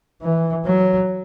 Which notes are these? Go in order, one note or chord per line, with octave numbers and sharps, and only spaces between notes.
E3
F#3